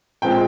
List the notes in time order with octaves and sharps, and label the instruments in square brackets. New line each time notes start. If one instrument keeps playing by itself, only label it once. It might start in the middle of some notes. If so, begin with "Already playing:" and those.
[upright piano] A#2 F3 G#3 C4 G5